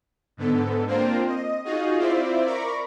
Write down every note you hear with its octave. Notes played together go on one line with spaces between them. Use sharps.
G#2 D3 B3 A4
A#3 C4 D4 F4 A#4 C5
D#5
D#4 F4 F#4 G#4 D#5
C4 E4 F4 C5 D5 E5
A#4 D5 A#5 B5 C#6 D6